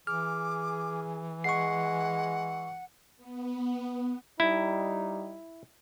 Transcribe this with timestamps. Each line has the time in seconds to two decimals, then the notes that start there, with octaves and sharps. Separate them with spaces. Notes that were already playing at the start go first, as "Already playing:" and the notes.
0.07 E3 G#4 D6 F6
1.44 G#3 F#5 C#6 C7
3.17 B3
4.40 G3 D#4 E4